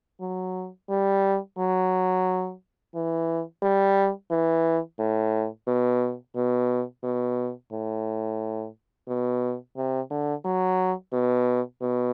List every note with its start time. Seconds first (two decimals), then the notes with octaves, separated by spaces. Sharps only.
0.21 F#3
0.90 G3
1.58 F#3
2.95 E3
3.63 G3
4.31 E3
4.99 A2
5.67 B2
6.36 B2
7.04 B2
7.72 A2
9.08 B2
9.77 C3
10.11 D3
10.45 F#3
11.13 B2
11.82 B2